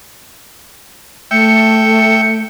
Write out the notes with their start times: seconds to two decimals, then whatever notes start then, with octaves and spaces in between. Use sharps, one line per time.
1.31 A3 E5 G5 C#7